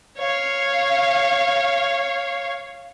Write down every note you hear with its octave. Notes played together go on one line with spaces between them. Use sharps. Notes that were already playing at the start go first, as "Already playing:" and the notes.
C#5 F5